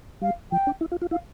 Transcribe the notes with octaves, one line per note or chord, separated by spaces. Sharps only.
G3 F5
F3 G5
D4
E4
F4
F4
E4 F5